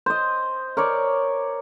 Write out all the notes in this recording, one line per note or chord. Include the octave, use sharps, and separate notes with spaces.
C5 D#5
A#4 C#5 D5